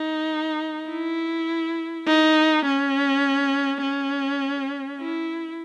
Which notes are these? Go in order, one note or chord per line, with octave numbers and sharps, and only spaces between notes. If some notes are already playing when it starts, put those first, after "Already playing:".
Already playing: D#4
E4
D#4
C#4
C#4
E4